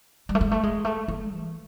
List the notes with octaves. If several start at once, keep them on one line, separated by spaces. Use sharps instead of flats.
G3
A3
G#3
A3
G#3
A3
A#3
E3